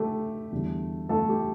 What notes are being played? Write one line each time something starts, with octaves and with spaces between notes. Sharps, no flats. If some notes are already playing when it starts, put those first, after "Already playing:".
Already playing: D3 A3 G4 A4
E2 D3 G3
A3 A4
G4